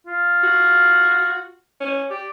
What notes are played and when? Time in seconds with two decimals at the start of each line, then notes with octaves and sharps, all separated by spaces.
0.07 F4
0.43 F#4
1.81 C#4
2.10 G4 D5